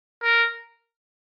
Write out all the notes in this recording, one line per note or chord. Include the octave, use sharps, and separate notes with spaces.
A#4